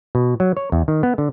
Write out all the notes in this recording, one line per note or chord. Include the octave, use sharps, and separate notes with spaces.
B2
F#3
C#5
E2
D#3
B3
D3